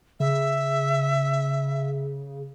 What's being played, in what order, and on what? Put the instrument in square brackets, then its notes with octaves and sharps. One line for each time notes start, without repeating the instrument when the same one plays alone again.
[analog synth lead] C#3 [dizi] E5